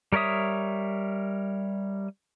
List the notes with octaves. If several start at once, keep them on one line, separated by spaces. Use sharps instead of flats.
G3 A#4 C#5 E5 D#6